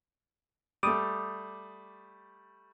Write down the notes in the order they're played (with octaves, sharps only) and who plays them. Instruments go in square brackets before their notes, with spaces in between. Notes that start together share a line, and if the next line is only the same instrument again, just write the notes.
[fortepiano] G3 A3 [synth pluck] D6 D#6